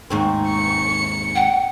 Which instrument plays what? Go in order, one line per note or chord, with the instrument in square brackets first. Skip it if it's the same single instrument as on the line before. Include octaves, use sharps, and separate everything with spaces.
[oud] D#2 G#2 C4 [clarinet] D#4 [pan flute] C#6
[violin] C#7
[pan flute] F#5 [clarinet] G5